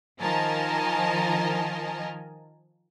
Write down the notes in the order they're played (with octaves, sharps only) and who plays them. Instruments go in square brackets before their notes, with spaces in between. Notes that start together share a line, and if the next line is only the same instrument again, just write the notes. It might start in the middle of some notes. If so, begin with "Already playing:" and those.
[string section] D#3 F3 A#4 D#5 G#5 A5